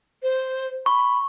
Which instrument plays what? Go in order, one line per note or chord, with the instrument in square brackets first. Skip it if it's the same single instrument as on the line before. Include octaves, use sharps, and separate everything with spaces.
[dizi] C5
[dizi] B5 [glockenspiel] C#6